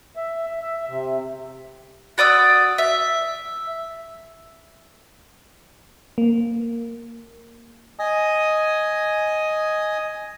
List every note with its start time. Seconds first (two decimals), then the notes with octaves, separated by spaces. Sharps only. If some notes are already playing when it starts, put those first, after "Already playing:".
0.16 E5
0.62 E5
0.88 C3
2.18 F#4 D5 D#6 E6
2.78 E5
6.18 A#3
7.99 D#5 G#5 D#6